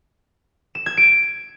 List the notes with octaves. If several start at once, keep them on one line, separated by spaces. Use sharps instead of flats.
E7
G#6
D7